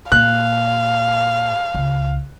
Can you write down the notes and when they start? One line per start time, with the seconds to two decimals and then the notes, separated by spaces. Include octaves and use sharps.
0.12 A#2 F5 F#6
1.74 C#2